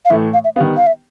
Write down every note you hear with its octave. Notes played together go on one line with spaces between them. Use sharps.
F5
A2 E3 A3 E5
F5
E5
D#3 G3 B3 F5
F5
E5